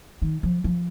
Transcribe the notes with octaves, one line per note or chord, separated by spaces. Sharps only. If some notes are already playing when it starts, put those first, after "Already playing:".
D#3
F3
F3